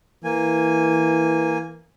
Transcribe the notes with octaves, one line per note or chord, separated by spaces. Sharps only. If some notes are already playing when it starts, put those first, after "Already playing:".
E3 A#3 G#5